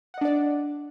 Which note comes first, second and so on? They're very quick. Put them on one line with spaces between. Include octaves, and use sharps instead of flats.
F#5 D#5 D4 D5